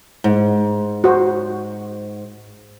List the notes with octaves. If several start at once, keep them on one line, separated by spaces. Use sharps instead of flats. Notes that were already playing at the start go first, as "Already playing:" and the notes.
G#2
F#4 C5